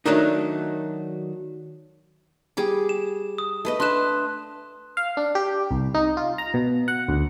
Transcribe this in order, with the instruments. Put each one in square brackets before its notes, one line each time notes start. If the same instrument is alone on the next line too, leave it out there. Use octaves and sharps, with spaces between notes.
[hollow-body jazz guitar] D#3 F#3 A3 D4 D#4
[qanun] G3 G#4 D6
[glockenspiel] E7
D#6
[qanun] A3 B4 D#5
[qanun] D4 E5 [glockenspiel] C6 F#6 E7
[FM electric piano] F5
D4
G4
C2
D#4
F4
A#5
B2
F#5
D2